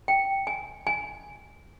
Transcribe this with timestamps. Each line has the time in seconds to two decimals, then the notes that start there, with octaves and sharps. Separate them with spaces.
0.08 G5
0.47 G#5
0.87 G#5